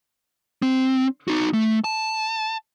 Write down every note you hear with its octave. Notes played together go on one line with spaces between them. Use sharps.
C4
D#4 F#4
A3
A5